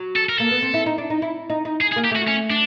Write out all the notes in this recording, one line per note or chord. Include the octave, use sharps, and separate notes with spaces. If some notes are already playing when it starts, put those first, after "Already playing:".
Already playing: F#3
A4
A#4
A#3 A4
B3
C4
E4
D#4
D4
D#4
E4
D#4
D#4
G#4
G#4
A#3
G4
A3 F#4
C#4
D4